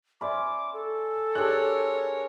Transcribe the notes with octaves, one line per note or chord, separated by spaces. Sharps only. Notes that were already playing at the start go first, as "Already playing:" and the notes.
C#4 C5 D5 E5 B5 D6
A4
G#3 D4 G4 A#4 C#5 E6 F#6